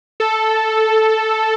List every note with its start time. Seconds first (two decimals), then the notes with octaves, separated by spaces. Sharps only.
0.20 A4